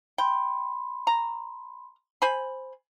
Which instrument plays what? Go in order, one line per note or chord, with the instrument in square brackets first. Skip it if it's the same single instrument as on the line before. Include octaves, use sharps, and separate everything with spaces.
[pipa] G5 [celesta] B5 C6
[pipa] A#5
C5 G#5 B5